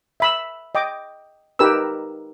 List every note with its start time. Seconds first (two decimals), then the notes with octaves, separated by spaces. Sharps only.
0.20 E5 B5 E6
0.75 D#5 G5 D6
1.59 D#4 G4 A#4 B4 E6